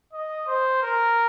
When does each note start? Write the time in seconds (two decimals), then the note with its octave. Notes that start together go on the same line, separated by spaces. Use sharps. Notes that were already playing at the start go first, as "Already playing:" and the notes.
0.13 D#5
0.47 C5
0.83 A#4